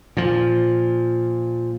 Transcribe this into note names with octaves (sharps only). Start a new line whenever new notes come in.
A#2 F3